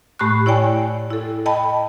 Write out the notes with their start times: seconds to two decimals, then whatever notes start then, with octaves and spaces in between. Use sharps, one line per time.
0.19 A2 A3 G4 B5 C#6 F#6
0.46 E4 C#5 D5 G5 G#5
1.11 E4 A4
1.46 D#5 G5 A5 B5